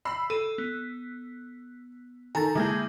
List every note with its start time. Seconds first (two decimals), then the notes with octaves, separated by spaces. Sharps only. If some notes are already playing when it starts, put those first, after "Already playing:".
0.05 B5 E6 C7
0.30 A4 D#7
0.58 B3
2.35 D#3 A4 G#5 A#5 A6
2.55 D3 G#3 A#3 E4 G#4 G6